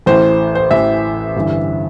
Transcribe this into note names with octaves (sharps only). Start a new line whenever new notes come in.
A1 A2 E3 C5
C5
A1 A2 E3 E5
G1 G2 E3